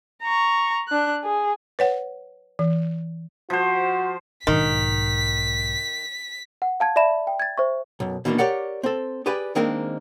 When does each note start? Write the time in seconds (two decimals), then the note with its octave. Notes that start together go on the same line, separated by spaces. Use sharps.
0.22 A#5 C#6
0.88 D4 F#6
1.24 G#4
1.79 B4 C#5 F#5
2.59 E3
3.50 F3 F#4 C5
4.47 B1 G#2 D#3 B6
6.62 F#5
6.80 F5 A5 G#6
6.96 D5 E5 A5 B5 E7
7.27 G5
7.40 G#6 A6
7.57 C5 E5 C#6
8.00 B1 F#2
8.25 B2 D#3 E3 A3 A#3 D4
8.38 G4 A#4 C#5 D5 F#5
8.83 C4 A4
9.26 G4 G#4 B4 D5 G#5
9.55 D#3 G#3 A#3 C4 D4 A#4